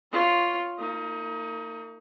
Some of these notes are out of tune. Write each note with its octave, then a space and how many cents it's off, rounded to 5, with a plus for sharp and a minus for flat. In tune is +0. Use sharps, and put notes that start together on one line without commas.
F4 +0 C#5 +0
A#3 -35 D#4 +30